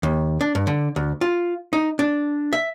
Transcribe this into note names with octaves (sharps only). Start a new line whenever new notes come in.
D#2
D4
G2
D3
D2
F4
D#4
D4
E5